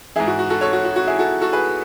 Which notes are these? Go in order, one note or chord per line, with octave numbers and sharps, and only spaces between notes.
G#2 E3 E4 G#4
F#4
F#4
F#4 A4
A4 C#5
F#4
F#4
F#4
E4 G#4
F#4 A4
F#4 A4
G#4 B4